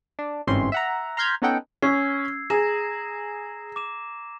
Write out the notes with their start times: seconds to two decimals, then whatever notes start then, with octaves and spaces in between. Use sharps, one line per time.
0.19 D4
0.47 G1 G#2 E3 C4 C#4 C6
0.72 E5 F#5 A#5
1.17 A#5 C6 F6 G6 G#6 B6
1.42 B3 C#4 D#4 A4 F#5 G5
1.82 C#4 E6 G#6 C7
2.50 G#4 A#5 A#6 E7
3.76 D6 E7